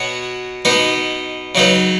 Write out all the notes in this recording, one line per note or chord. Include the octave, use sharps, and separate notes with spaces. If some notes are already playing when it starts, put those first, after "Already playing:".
Already playing: B2 B3 F#4 C#5
B2 B3 D#4 B4
C#3 F#3 D#4 B4